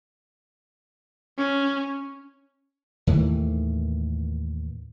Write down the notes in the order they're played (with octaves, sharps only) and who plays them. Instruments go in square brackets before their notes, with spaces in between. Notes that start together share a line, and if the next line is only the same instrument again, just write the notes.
[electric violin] C#4
[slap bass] D#2 A2 D#3 E3